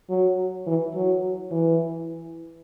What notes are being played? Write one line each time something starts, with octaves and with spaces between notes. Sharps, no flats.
F#3
E3
F#3
E3